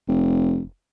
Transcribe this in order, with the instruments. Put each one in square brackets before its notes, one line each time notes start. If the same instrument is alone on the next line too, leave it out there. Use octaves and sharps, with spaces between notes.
[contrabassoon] F1